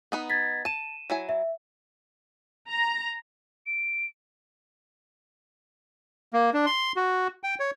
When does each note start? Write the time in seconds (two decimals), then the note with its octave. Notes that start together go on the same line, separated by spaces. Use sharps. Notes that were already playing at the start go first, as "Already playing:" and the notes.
0.12 B3 D#4 B4
0.30 G#6 A6 B6
0.65 A5 D#7 E7
1.10 F#3 E4 G#5
1.29 E5
2.68 A#5
3.66 D7
6.33 A#3
6.54 D4
6.66 C6
6.96 F#4
7.43 G5
7.60 C#5